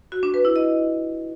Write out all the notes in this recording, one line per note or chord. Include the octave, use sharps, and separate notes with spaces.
F#4
D4
B4
E4
D#5